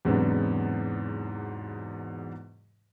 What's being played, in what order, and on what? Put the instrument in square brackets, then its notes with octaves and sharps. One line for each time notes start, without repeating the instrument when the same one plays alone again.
[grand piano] E2 G#2 C3 F#3 B3 D4